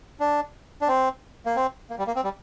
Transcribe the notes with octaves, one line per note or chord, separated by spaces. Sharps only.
D4
D4
C4
A#3
C4
A#3
G3
A#3
C4
G3